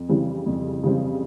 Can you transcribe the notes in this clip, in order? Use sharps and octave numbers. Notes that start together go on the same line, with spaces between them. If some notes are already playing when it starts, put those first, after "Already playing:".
Already playing: F2
C#3 E3 G3 C4
F2
C#3 E3 G3 C4